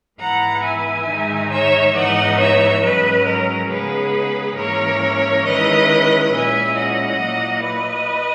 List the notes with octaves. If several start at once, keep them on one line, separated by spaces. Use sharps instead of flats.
G#2 E3 B3 E4 F#5 A#5
E5 G#5
G#2 D#3 G#3 D#4
C#5 E5
G#2 E3 B3 D#4 D#5 F#5
C#5 E5
G#2 F#3 C#4 B4 D#5
A#4
C#3 G#3 B3 D#4 G#4 B4
G#2 E3 A#3 C#4 A#4 C#5
D#3 G#3 C#4 E4 B4 D#5
A#2 G#3 C#4 E4 E5 G#5
D#5 F#5
A#2 F#3 A#3 E4
B4 D#5